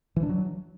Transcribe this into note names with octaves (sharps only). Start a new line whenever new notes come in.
E3
D4
F#3